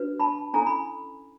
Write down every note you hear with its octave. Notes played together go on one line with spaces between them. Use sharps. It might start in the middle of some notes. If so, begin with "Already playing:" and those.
Already playing: D4 F#4 B4
A5 B5
C#4 E4 A4 G#5 A#5
B5